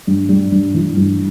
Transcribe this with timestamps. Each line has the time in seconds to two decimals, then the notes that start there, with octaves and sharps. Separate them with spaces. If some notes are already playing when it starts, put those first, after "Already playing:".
0.07 G2
0.29 G3
0.52 G2
0.74 E3
0.97 G2